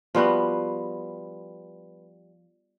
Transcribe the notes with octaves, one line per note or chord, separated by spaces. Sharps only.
F3 G3 B3 F#4